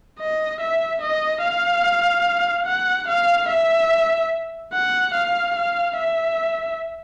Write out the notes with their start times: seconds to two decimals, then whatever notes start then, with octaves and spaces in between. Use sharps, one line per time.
0.19 D#5
0.61 E5
1.02 D#5
1.43 F5
2.66 F#5
3.08 F5
3.49 E5
4.73 F#5
5.14 F5
5.56 F5
5.97 E5